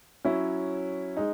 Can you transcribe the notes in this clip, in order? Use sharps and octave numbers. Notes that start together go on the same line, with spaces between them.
F#3 C#4 E4
G#3 D#4